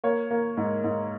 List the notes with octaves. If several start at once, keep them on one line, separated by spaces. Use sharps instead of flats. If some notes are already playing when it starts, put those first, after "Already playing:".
A#3 C#5
A#3
G#2
G#2